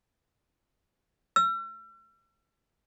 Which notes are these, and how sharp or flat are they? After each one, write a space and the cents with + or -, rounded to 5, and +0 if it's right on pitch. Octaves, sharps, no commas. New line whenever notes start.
E6 +45